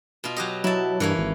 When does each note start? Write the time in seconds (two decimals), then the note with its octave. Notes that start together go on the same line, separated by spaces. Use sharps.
0.24 B2 F4
0.36 F#3 G4 D#5
0.64 F#3 E4 A5
1.00 G2 E3 A#3 C#5
1.18 G#1